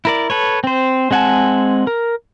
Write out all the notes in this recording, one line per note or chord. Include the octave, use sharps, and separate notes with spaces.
E4 A#4 D5
A4 B4 C#5
C4 C5
G#3 C4 F#5 G#5 A5
A#4